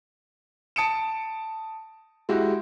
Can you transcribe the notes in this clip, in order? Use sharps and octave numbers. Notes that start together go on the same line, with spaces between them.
A5 D#6 C#7 D7 E7
G#3 E4 F#4 G4